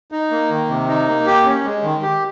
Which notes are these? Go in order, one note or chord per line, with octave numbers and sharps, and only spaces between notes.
D#4
A#3
D#3
C3
D#4
A#3
G4
C#4
G#3
D#3
G4